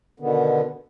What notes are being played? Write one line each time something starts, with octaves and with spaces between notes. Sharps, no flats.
B2 D3 D#3 B3